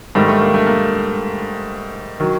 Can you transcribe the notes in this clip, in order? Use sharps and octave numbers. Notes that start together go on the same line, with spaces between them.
G#2 D#3 G3 A3
A3
A#3
A3
A#3
D#3 F#3